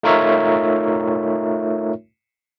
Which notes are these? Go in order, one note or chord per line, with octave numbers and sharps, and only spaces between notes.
A3 D#4 F4 A#4 C#5 E5